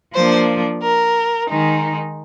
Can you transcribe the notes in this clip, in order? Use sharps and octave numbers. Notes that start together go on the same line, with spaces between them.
F3 A#3 D4 C5
A#4
D#3 G#3 D#4